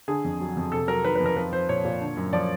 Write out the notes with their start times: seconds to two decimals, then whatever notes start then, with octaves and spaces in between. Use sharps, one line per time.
0.08 D3 G#4
0.25 F2
0.40 F#3
0.57 F2
0.72 C3 A4
0.88 F#3 A#4
1.04 D#3 B4
1.15 F2 B4
1.26 A#4
1.36 F3 B4
1.52 F3 C5
1.69 A#2 C#5
1.85 A#2
2.01 D3
2.17 F#2
2.33 F3 D5